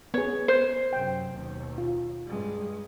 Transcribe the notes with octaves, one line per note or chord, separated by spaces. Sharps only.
B3 G#4 C#5
C5
F#2 C3 G5
D#2 B2
F4
G2 G#3